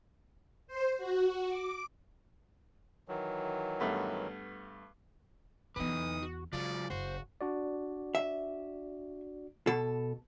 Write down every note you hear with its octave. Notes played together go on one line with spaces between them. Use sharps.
C5
F#4
D6
D#3 E3 F#3
G2 A3 B3
E2 E3 B3 D#4 B4 D#6
F#4
C#3 F#3 G#3 F4 D5
F#1 F#4 C5
D4 F#4 D5
E5
B2 A4